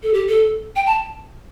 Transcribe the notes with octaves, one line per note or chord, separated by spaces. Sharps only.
A4
G4
A4
G5
A5